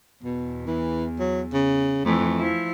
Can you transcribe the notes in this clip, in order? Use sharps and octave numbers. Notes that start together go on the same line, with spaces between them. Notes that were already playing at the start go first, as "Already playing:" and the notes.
E2 B2
E3
F#3
C#3
F2 E3 A3
F3 E4